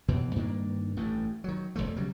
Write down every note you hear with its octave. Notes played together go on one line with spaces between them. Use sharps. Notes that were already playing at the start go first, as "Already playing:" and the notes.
D#2 B2 E3 C4
G2 D#3 A#3 D4
A1 G2 A3
D#3 F#3
D1 G1 F3 A3
C#3 F#3 G3